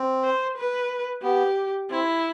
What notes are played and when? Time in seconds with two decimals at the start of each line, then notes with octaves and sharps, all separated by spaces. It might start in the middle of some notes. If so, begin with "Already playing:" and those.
Already playing: C4
0.23 C5
0.57 B4
1.23 B3 G4
1.90 C4 E4